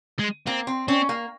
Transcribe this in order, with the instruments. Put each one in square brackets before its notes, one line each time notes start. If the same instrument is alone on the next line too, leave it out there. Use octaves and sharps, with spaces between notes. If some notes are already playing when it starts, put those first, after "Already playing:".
[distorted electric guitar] G#3
[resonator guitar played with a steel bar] A#3 [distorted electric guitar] C4
[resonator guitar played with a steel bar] C4
[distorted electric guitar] C4 [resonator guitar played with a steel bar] C#4
[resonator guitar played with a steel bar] A#3